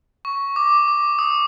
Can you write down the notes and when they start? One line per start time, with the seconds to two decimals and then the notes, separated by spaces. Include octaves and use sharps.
0.25 C#6
0.56 D6
0.88 D6
1.19 D#6